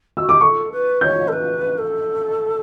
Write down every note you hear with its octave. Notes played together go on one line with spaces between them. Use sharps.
F#4 E6
G4 D6
A4 C#6
B4
C#5 G6
A4
B4
A4